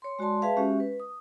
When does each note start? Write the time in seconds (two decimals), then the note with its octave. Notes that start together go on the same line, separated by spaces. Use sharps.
0.02 C#5 C6
0.19 G#3 F#4 D5 A5 C6
0.42 G#4 B4 E5 F5 A5
0.57 G#3 C#4 F#4 G4 E5
0.80 B4
1.00 D#6